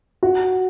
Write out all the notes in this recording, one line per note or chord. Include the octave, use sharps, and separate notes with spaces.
F#4